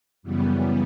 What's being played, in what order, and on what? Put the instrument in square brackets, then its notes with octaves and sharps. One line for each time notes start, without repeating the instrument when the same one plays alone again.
[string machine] F#2 C#3 E3 G3 B3